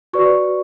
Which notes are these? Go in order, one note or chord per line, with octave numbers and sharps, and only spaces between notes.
F#4 B4 D5 C#6